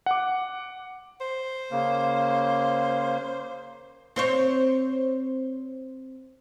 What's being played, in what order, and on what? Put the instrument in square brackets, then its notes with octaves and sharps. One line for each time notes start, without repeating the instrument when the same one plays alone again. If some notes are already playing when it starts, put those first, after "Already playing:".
[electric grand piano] F#5 D6
[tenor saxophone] C5
[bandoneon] C#3 A#3
[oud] C4 C5 C#5